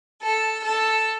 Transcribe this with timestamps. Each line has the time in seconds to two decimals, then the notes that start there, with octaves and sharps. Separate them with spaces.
0.22 A4
0.65 A4